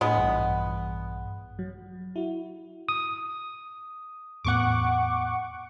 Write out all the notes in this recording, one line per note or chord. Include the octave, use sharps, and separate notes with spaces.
A2 G#3 B3 D4 D#6
A#1 G2 E3
F#3
E4 F#4
D#6
E2 A2 B3 F#5 C#6 D6